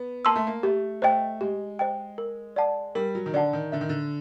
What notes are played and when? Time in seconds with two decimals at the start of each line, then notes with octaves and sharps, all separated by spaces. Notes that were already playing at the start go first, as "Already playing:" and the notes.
Already playing: B3
0.25 A#3 A5 C6 E6
0.36 A3
0.47 A#3
0.63 A3 G4
1.02 A3 C5 D#5 G5
1.41 G#3 G4
1.79 C5 D#5 G5
2.18 A#4
2.56 D5 F#5 A5
2.95 G3 A#4
3.15 F#3
3.26 D#3
3.34 D3 D5 F#5 A5
3.53 D#3
3.72 D3 E5
3.81 D#3
3.89 D3